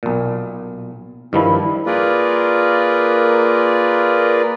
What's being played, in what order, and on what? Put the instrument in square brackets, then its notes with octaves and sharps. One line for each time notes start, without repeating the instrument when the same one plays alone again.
[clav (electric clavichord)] B1 A#2
[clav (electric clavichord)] G2 D#3 F3 [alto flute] E4
[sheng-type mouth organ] A#3 F4 G#4 A#4 B4 D5